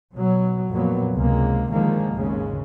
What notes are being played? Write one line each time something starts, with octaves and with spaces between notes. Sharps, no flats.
B2 F#3
F2 A#2 F#3 A#3 B3
C#2 C3 G#3 A#3
D3 D#3 F3 G#3 A#3
G#1 D#2 C#3 G#3